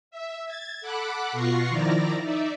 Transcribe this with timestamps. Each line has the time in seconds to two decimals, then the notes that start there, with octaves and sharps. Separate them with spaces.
0.11 E5
0.46 G#6 A6
0.81 A4 F#5 B5 D6 F#6
1.32 B2 F4 F#5 C#6 A#6 C7
1.69 D#3 F3 E4 D5 A#5 A#6
2.23 D#4 D5 E5